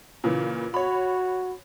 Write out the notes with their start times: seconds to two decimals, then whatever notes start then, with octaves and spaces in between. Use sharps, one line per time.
0.24 A#2 C#3 E3
0.74 F#4 C#5 B5